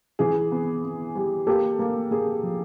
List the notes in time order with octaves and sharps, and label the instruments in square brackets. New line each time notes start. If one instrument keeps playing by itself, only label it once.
[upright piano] E3 G#4
B3
B3
G3
A#3 G4 A4
A#3
A#3 G#4
F3